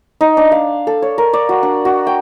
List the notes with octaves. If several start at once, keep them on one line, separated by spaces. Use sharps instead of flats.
D#4
D4
F5
A4
C#5
A#4
D5
F#4
D4
F#4
G5